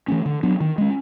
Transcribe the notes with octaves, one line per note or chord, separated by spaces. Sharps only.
E3 A3 C#4
D3
F#3 B3 D4
D#3
G#3 C#4